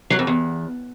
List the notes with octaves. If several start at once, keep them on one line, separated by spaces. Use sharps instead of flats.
F#3
F2
E2